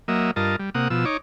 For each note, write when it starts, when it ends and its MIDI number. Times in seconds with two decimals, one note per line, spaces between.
0.08 0.31 54
0.08 0.31 58
0.08 0.31 75
0.08 0.31 76
0.36 0.56 43
0.36 0.56 65
0.36 0.56 70
0.36 0.56 75
0.36 0.56 81
0.59 0.70 55
0.75 0.88 48
0.75 0.88 58
0.75 0.88 78
0.75 0.88 87
0.90 1.05 47
0.90 1.05 53
0.90 1.05 88
1.05 1.17 63
1.05 1.17 73
1.05 1.17 86